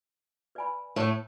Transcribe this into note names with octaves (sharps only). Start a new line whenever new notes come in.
B4 D5 G#5 B5
A2 A3